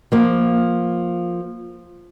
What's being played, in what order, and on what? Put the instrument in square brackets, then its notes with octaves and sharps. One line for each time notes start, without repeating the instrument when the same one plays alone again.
[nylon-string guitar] F3 A#3